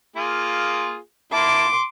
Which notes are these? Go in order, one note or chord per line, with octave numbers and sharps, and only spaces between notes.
A#3 F4 G#4
A#3 E4 A5 C6 D6